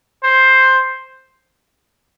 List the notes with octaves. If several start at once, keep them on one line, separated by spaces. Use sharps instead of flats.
C5